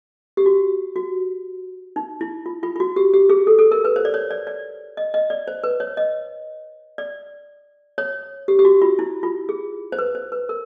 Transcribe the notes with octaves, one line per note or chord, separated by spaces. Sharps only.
G4
F#4
F#4
D#4
E4
F4
F4
F4
F#4
G4
G4
G#4
A4
A4
A#4
B4
C5
D5
C#5
D5
D5
D#5
D#5
D5
C5
B4
C#5
D#5
D5
C#5
G4
G4
F#4
F4
E4
F4
G#4
C5
B4
C5
B4
A#4